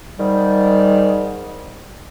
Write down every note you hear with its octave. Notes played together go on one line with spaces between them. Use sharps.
G#2 D#3 G3